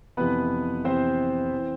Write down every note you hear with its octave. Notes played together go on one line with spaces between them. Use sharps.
F2 C3 E3 B3 B4
F2 C3 E3 C4 C5
E3